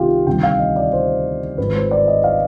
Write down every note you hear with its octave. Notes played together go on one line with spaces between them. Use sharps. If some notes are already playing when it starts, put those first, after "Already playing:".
Already playing: C2 C3 D#3 F4 G4 F5
D2 C3 D#3 G3 G5
F5
D#5
D5
C5
G#1 G#2 F3 G#3 B4
C5
D5
D#5
F5